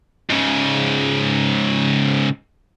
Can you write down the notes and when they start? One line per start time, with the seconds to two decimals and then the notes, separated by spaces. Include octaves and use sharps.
0.30 G#2 C#3